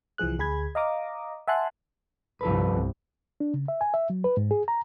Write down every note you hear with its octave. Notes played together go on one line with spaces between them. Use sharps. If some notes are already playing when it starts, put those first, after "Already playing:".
C2 E3 F3 G#4 F#6
D2 G#4 B5 G#6
D#5 F5 A#5 D6 D#6
E5 F#5 G#5 A5 C6 F#6
G1 C2 F3 A4 B4
D4
C#3
E5
G#5
E5
F#3
B4
G#2
G#4
A#5